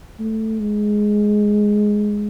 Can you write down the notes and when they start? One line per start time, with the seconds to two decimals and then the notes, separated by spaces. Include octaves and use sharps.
0.19 A3
0.60 G#3